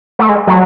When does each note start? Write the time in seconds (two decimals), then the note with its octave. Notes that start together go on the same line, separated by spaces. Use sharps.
0.19 A3
0.29 G#3
0.47 F#3